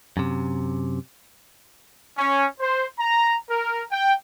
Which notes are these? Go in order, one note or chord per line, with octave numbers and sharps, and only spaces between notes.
F#2 C3
C#4
C5
A#5
A#4
G5